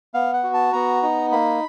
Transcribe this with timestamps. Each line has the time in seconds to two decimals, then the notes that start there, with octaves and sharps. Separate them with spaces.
0.14 B3 F5
0.33 F#5
0.44 F#4
0.54 A5
0.73 B3 A#5
1.03 D#4
1.32 A#3 B5